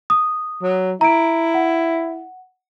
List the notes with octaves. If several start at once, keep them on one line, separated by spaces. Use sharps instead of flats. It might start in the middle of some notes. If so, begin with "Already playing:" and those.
D#6
F#3
E4 A#5 D7
F#5